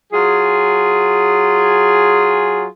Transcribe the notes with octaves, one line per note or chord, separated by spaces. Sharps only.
F#3 F4 G#4